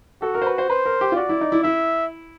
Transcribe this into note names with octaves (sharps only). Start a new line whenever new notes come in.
F#4 A4
A#4
C5
B4
C5
B4 C5
A#4
G4
F4
F#4 D5
E4
D#4
E4
E4 E5